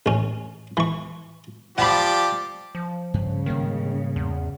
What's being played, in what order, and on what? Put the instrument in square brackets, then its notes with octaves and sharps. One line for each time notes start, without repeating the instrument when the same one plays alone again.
[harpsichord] A1 C#4
E3 C#6
[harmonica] F3 G4 D5 [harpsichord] F#5 B5
[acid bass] F3
[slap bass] G2 [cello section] C#3
[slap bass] G#2 G3 A#3 [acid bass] D#3
[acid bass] E2